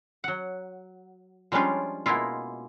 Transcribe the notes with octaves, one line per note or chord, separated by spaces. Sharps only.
F#3 F#5
F3 G3 G#3 C#4 D4 F4
B2 G#3 A#3 E4 F4